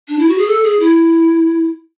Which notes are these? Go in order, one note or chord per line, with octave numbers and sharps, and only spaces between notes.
D4
E4
F#4
G#4
A4
G#4
E4